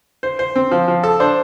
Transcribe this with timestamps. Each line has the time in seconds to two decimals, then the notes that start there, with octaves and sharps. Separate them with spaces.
0.23 C5
0.39 C5
0.56 C4
0.71 F3
0.88 F3
1.03 A4
1.20 D4 C5